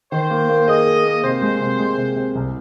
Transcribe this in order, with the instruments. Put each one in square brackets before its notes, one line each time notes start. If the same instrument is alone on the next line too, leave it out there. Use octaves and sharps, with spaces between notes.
[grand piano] D#3 [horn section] C5
[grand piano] A#3
A#3
[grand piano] G#4 [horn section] D#5
[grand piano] G#4
A#3
[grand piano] C3 [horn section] C5
[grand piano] G#3
C3
G#3
C3
C3
C2